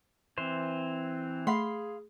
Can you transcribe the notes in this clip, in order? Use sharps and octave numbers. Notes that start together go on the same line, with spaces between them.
E3 C4 C5
A3 G#4 F5 F#5 B5 C6 C7